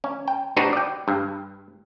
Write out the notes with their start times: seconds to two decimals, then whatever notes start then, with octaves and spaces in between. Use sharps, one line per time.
0.04 C#4
0.28 G5
0.57 D4 D#4 F#4 G4 B4 C5
0.73 D5 G5
1.08 G2